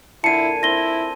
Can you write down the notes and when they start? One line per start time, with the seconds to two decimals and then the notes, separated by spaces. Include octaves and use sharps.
0.24 A#2 D3 E4 G#5 A5 C7 C#7 D#7
0.63 C4 E4 A#6 G7